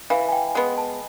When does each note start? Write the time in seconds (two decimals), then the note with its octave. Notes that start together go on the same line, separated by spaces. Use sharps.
0.10 E3 F5
0.29 G#5
0.32 G5
0.55 G#3 B3 G#5
0.78 A5